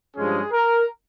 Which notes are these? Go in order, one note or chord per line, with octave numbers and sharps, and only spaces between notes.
G2 F3 G#3 C#4 G#4
A#4